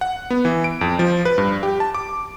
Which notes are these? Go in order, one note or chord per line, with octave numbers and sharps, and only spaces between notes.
F#5
B3
E3
D7
F2
F3
B4
G2
G4
A5
D6